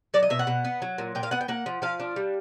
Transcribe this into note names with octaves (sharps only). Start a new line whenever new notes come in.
F#3 D5
D#5
B2 E5
F#5
B2
B3
F#3
A#2
A#2 G5
F5
B3 F#5
G5
A#3 F#5
F3
F3 F5
D4
G3